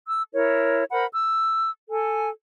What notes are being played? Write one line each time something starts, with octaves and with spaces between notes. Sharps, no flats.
E6
E4 A#4 C#5
A#4 C5 F#5 B5
E6
A4 G#5